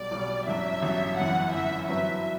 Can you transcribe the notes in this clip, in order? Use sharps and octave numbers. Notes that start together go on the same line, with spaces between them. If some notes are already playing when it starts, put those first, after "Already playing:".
Already playing: B1 B2 G3 D5
B1 B2 G3
A1 G2 F#3 E5
A1 G2 F#3
G1 F#2 E3 F#5
G1 F#2 E3 E5
G2 F#3 C4 F#4 B4 E5